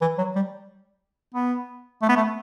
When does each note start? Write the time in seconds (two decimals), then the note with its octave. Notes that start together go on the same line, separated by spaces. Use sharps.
0.01 E3
0.18 F#3
0.36 G3
1.35 B3
2.02 A3
2.09 B3
2.17 A3